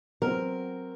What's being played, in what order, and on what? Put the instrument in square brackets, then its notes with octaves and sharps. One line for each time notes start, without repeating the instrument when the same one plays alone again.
[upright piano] F#3 C4 [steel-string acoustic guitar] A#4